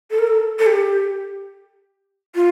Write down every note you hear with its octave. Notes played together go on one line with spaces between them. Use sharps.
A4
A#4
A4
A4
G4
F4